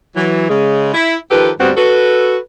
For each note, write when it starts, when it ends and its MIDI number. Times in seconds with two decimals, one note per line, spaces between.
0.16 0.47 52
0.16 0.47 54
0.49 0.92 49
0.49 0.92 56
0.94 1.17 64
1.31 1.50 51
1.31 1.50 53
1.31 1.50 67
1.31 1.50 69
1.31 1.50 71
1.60 1.72 38
1.60 1.72 43
1.60 1.72 55
1.60 1.72 59
1.60 1.72 60
1.60 1.72 66
1.77 2.37 66
1.77 2.37 69
1.77 2.37 71